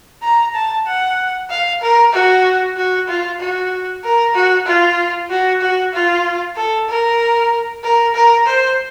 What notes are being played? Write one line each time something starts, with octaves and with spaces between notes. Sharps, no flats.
A#5
A5
F#5
F5
A#4
F#4
F#4
F4
F#4
A#4
F#4
F4
F#4
F#4
F4
A4
A#4
A#4
A#4
C5